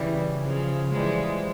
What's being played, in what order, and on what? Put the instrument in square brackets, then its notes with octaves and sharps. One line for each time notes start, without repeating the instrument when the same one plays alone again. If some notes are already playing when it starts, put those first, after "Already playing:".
Already playing: [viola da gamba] C#3 [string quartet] E3 G3
[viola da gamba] C#3 F3
[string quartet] E3 G3 [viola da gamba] F3 G#3